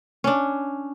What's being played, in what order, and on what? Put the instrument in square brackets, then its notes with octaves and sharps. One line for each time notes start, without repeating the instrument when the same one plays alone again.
[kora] C#4 D4